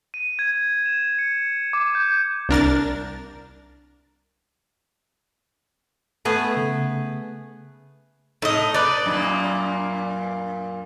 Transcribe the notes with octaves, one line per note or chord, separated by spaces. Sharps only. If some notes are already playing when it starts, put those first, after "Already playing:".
D#7
G#6
E7
C#7
D6
G6
C2 D4 A#4 A6
A3 B3 G#4
C#3
A2 D#4 D#5
B4 D5
F#2 A#2 A#3